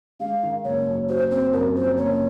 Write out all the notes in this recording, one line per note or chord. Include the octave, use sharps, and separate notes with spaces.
G#3 F5
D#3
F#1 C#5
F#2
F#4 C5
C4 C5
F#2 A#4
F3 C5
F#1 C#5